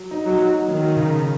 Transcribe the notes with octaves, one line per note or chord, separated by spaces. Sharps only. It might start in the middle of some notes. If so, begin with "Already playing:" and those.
Already playing: F#3
D#4
F#3
D#4
D#3 F#3
C#3